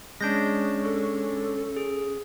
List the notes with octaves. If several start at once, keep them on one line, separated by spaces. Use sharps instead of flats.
G#3 C#4 D4 G6 A#6
A4
G#4